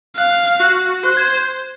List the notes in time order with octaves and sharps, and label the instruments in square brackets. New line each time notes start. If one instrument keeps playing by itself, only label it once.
[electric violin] F5 [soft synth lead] F#6
[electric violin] F#4 [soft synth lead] F#6
[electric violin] C5 [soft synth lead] F#6
[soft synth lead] G#6